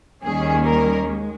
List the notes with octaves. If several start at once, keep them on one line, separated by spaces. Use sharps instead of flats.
D#2 D#3 G3 A#3 C#4 G#4
A#4
G#3